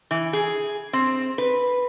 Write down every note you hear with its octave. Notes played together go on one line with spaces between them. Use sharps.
E3
G#4
C4
B4